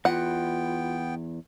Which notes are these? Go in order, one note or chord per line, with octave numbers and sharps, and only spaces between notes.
E2 B3 F4 F#5 G5